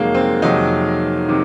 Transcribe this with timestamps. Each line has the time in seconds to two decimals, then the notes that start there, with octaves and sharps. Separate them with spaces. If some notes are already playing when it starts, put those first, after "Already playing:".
Already playing: F2 C3 D#3 F#3 G#3 A#3
0.14 C4
0.42 F2 C3 D#3 F#3 D#4
1.28 C3 D#3